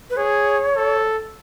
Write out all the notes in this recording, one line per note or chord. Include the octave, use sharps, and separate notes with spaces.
B4
G#4 C#5
A4